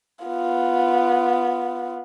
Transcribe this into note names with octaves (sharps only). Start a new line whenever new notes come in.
B3 F4